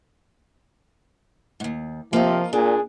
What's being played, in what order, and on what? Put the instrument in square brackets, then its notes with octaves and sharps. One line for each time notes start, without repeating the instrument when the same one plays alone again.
[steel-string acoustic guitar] D#2 G#2
[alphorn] C3 [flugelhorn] F3 [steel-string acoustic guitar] A#3 F4 D#5
[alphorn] A#2 [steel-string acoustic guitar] D4 [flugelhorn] G#4